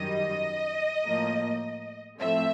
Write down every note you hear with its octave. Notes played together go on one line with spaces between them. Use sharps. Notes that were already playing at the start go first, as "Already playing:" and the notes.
Already playing: F#2 D#3 G3 D#5
A2 F3 A#3
A2 F3 A3 C4 E5